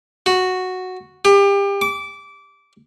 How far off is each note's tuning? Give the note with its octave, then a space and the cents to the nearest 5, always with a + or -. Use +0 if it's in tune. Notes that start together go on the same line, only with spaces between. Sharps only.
F#4 -5
G4 +30
D6 -20